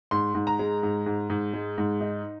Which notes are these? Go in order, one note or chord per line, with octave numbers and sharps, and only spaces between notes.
G#2 C6
G#2
A#5
G#3
G#2
G#2
G#2
G#3
G#2
D#4